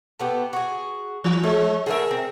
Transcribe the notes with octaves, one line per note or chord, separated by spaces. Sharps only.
A3 B3 G4
F#4 G#4
E3
G#3 C#5
D3 A3 G#4 A#4 E5
C4